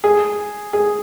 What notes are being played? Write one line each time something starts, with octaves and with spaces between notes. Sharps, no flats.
G#4
G#4